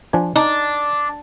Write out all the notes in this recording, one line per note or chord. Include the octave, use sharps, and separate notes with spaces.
F3 D4 G#5
D4 D#4